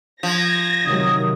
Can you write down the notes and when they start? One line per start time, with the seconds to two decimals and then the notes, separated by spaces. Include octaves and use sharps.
0.23 F3 G#6 A#6
0.86 C3 D#3 F#3 D#6